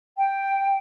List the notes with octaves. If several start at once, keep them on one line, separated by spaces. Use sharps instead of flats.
G5